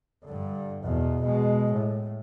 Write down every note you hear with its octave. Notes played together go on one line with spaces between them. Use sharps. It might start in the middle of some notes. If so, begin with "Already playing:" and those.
G2 D3
E2 B2
B2 G#3
A2